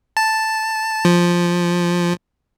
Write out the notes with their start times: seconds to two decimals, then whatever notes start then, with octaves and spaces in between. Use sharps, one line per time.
0.17 A5
1.05 F3